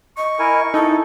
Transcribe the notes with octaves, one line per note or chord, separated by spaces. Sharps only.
D#5 C#6
E4 A#4 G#5
D#4 E4 A4